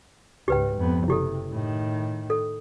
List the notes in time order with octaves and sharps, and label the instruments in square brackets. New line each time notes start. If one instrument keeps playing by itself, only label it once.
[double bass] C#2 G#2 [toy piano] G4 B4 G5
[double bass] F2 B3
[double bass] F#1 C3 [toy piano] E4 G4 A4
[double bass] A2 D#3
[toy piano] A4